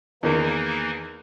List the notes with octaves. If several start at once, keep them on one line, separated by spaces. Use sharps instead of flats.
E2 D#3 E3 A#3 D#4